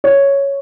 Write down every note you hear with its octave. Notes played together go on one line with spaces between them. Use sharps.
C#5